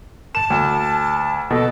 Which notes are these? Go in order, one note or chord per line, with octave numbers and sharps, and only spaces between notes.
A5 E7
D2
B2 A4